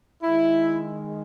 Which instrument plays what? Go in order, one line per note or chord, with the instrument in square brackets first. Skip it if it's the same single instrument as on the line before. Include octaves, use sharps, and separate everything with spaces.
[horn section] D#3 G#3 E4